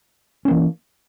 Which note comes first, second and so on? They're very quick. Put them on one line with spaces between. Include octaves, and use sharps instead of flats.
C#4 A#3 E3